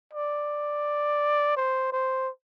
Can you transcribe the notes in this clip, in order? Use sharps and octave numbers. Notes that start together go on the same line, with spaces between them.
D5
C5
C5